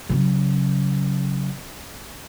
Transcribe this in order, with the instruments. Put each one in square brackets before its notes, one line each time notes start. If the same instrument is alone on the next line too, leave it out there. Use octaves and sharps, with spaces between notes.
[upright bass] C#3 F#3